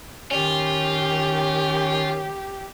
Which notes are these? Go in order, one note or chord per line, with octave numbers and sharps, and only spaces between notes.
D#3 C#4 F4 G4